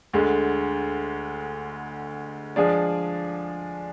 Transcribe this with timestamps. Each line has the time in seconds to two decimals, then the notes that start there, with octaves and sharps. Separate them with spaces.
0.13 D2 D3 G#3
2.56 F3 G#3 D4 G#4 D5